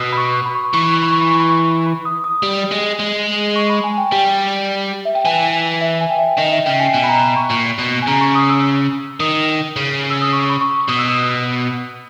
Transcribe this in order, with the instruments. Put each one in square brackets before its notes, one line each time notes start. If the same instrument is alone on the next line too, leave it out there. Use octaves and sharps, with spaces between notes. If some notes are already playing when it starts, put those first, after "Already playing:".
Already playing: [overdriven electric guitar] B2 [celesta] D#6 E6
[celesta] B5
C#6
B5
C#6
B5
[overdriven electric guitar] E3 [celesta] C#6
[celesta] B5
C#6
B5
C#6
B5
C#6
B5
C#6
B5
B5
D#6
D#6
[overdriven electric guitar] G3
G#3
G#3
[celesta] C#6
B5
G#5
G5
[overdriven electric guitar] G3 [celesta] G5
[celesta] E5
G5
[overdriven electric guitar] E3 [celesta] G#5
[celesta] E5
G#5
G5
E5
[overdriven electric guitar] D#3 [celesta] D#5
[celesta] E5
[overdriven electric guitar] C#3 [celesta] G5
[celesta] G#5
[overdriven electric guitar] B2 [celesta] G#5
[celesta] B5
A#5
B5
C#6
[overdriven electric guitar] A#2
B2
[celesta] G#5
[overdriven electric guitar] C#3 [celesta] A#5
[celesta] C#6
D#6
E6
[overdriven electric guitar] D#3 [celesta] D#6
[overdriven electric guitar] C#3
[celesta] E6
D#6
C#6
B5
C#6
[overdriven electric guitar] B2 [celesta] D#6
[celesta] E6
D#6